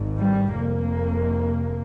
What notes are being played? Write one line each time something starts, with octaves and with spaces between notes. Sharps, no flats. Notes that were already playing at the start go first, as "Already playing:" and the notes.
Already playing: G#1 G#2
G3
F1 F2 C3 A#3